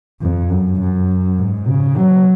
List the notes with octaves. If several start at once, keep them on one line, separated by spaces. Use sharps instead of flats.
F2
F#2
F#2
G#2
C#3
F#3